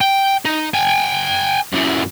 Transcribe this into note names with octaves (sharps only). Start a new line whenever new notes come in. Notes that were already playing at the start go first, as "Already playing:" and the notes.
G5
D#4
G5 G#5
F#2 E3